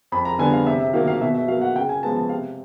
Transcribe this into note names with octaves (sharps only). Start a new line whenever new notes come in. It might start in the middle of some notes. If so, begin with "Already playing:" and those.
F2 B5
A#5
D3 G3 B3 G#5
F5
C3 E5
E5
D#3 F#3 A#3 F5
F5
B2 E5
E5
F#3 A#3 F5
F#5
C#3 G5
G#5
F3 G#3 B3 A5
A5
C3 F5